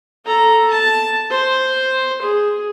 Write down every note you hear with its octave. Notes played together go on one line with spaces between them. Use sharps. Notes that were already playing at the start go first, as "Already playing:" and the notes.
A4 A#5
A5
C5
G#4